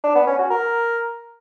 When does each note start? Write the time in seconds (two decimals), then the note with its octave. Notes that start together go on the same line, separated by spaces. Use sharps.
0.04 D4
0.15 B3
0.27 C#4
0.38 F#4
0.50 A#4